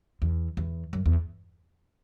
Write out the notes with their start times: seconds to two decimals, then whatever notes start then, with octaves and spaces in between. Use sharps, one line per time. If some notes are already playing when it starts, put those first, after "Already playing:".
0.22 E2
0.57 E2
0.93 F#2
1.06 E2